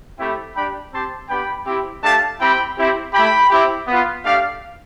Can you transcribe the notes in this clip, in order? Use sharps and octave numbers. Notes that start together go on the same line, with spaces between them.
A3 C4 E4 G4 G5 B5
G3 D4 G4 G5 B5
C4 G4 A5 C6
B3 D4 G4 G5 B5
C4 E4 G4
A3 D4 G4 F5 A5
C4 E4 G4 G5 B5
C4 E4 G4
A3 E4 G4 G5 B5
C4 E4 G4
B3 F4
A3 D4 G4 D5 F5